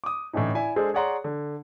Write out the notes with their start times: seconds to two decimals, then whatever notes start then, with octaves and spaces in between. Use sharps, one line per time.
0.04 D6 D#6
0.33 A2 D3 E3 C#4 D#4
0.55 E4 D5 E5 G#5
0.76 G#3 D4 G#4 A4 C5
0.94 G#4 C#5 D5 F#5 A#5 C6
1.24 D3